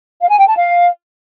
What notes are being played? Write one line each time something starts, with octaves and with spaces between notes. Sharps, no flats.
F5
G#5
G5
A5
F5